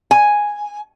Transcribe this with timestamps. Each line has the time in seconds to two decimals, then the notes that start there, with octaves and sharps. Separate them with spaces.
0.11 G#5